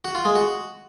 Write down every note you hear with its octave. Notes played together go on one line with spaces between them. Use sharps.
F#4
F4
G#3
F#4